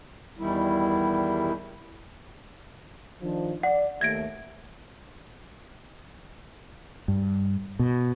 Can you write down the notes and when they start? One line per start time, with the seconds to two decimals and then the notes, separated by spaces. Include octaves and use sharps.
0.39 E2 D#3 G3 E4
3.22 D#3 F3 D4
3.63 D5 F#5
4.01 D#2 A3 E5 G#6 A#6 D7
7.08 G2
7.79 B2